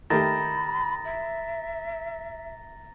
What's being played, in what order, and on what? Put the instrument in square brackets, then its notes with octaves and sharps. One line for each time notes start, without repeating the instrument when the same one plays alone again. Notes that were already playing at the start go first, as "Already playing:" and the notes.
[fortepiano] D#3 A3 G4 [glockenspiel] A#5 A6 A#6 [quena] B5
[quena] E5